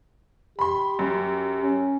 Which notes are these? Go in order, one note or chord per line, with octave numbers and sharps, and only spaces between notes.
G4 B5 C6
F#2
C#4